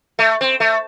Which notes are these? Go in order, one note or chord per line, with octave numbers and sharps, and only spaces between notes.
A3
C4
A3